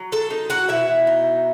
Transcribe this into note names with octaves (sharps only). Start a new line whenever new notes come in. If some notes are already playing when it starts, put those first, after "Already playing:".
Already playing: F#3
A4 A5
D#4
F#4 F#5
B2 E4 E5
D#4